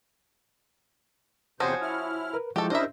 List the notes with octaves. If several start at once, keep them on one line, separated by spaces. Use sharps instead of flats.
E2 C3 F3 C#4 F#4 C5 D#6
E4 F6
A#4 B4
F3 G#3 E4 F#4 G4 A4
C#4 D4 E4 G4 A#4 C5 D#5 E5